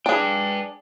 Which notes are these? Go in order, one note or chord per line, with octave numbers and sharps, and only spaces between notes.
D4 G#4 B4 G5